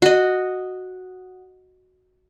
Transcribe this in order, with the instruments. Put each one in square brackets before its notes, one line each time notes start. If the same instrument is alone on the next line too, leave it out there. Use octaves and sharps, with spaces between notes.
[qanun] F#4 D#5